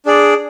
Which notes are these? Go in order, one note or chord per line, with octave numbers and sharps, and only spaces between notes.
D4 G#4 D5